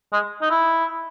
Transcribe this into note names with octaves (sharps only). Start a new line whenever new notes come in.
G#3
D#4
E4